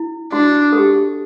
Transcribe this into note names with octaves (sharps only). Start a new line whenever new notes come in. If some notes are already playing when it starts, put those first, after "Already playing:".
Already playing: E4
D4 F#4
A4
G4